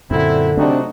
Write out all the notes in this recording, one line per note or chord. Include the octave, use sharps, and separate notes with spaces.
F#2 A#2 D3 C4 E4
C3 F#3 A3 C4 D4 D#4 F#4